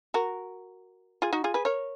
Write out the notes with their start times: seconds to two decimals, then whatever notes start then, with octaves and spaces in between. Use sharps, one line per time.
0.14 F#4 A#4
1.22 F4 G#4
1.33 D#4 F#4
1.44 F4 G#4
1.54 G#4 B4
1.65 A#4 C#5